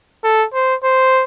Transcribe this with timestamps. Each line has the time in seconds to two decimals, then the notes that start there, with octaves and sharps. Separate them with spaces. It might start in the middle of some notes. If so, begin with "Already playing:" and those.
0.24 A4
0.54 C5
0.84 C5